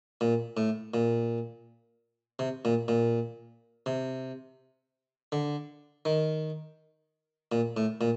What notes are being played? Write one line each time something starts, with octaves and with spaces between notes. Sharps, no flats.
A#2
A2
A#2
C3
A#2
A#2
C3
D3
D#3
A#2
A2
A#2